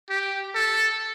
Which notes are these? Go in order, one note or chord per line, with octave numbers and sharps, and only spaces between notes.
G4
A4